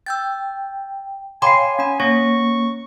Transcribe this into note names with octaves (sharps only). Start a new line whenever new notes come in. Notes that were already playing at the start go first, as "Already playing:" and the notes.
G5 E6 G6 A6
C#5 F5 G5 G#5 B5 C6 D6 C7
C#4 G#5 B5
A#3 C#4 C#5 C#6 A#6